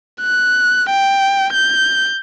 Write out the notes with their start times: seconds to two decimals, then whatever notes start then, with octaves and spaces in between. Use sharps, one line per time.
0.21 F#6
0.91 G5
1.54 G6